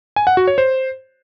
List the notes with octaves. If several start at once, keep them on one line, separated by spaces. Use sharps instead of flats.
G#5
F#5
F#4
C#5
C5